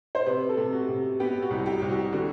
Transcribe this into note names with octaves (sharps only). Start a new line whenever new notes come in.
C5
C3 B4
A4
C3
F#4
C3
B3 G4
F#4
C2
G4
C2
F#4
D3 F#4